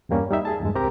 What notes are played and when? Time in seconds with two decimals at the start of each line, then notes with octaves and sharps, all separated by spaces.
0.09 E2 G2 G3 A#3 C#4
0.31 G3 D#4 E5
0.45 G#4 A5
0.61 E2 G2 G#3
0.75 C2 C4 G4 A#4 A#5